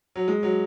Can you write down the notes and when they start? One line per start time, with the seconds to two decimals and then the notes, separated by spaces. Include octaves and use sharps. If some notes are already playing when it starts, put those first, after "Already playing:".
0.16 F#3
0.28 G#3
0.43 F#3